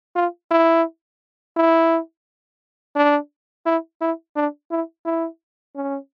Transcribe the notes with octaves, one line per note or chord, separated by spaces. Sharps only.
F4
E4
E4
D4
E4
E4
D4
E4
E4
C#4